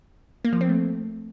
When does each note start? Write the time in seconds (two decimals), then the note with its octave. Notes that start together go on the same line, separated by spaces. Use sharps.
0.45 A#3
0.53 F3
0.61 C4
0.69 A3